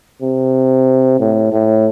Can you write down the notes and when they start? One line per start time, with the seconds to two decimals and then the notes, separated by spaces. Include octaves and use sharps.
0.22 C3
1.20 A2
1.52 A2